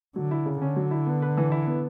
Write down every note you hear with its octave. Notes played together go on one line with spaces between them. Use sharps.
D3 F#3
E4
C#3
D3 C#4
F#3
E4
B3
B4
E3
E4
B3